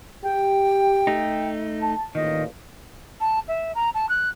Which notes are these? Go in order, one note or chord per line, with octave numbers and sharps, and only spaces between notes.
G4 G5
A3 D#4
A5
A1 A#2 D#3 D#5
A5
E5
A#5
A5
F#6